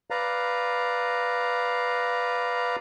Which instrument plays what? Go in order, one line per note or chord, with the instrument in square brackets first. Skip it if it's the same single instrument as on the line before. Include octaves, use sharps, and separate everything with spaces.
[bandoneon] B4 D5 F5 A#5